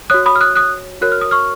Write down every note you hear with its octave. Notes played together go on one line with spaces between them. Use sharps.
F#4 C#5 D#6 F#6
B5 D#6
F6
D#6 F#6
D#6 F#6
F#4 A#4 C#5 F#6
F6
D#6
C#6 F6